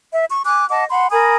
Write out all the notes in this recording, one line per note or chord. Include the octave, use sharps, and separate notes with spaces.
E5
C#6
G#5 D6 F#6
D#5 F#5 A5 D6
F#5 B5 C6
A#4 G#5 B5 D#6